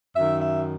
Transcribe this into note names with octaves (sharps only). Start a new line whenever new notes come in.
F#2 D#3 E5
E5